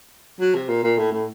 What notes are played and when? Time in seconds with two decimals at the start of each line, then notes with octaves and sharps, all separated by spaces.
0.40 F#3
0.55 C3
0.69 A#2
0.83 A#2
0.98 A2
1.12 A2